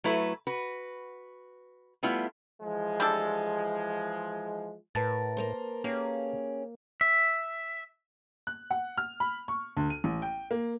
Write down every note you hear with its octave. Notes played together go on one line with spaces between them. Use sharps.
F#3 A3 E4 B4
F#4 B4
G3 A3 B3 E4 F4
E3 F3 G#3
G3 D4 A4
A2 A#4 B4 A5 A6
A#3 A#4 C5
A#3 C#4 G4 G#4
E5
F#6
F#5
F6
B5
C#6
D2
D#7
A1
G5
A#3